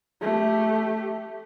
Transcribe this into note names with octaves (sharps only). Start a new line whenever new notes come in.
A3 G4